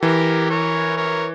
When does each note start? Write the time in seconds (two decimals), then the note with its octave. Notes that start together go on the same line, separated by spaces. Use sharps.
0.02 E3 G4 A#4
0.50 A#4 C#5
0.96 A#4 C#5